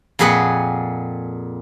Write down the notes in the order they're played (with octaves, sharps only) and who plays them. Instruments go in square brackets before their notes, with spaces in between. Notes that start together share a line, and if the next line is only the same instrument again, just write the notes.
[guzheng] F2 A#2 G#4 B4 F#5